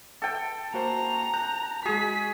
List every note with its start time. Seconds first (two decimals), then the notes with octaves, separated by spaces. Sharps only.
0.22 A4 G5
0.74 A#3 F#4 C5 A#5
1.34 F#6 G6 A#6
1.85 G#3 F#4 G#4 B6